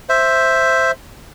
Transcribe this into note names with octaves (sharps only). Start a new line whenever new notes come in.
C5 E5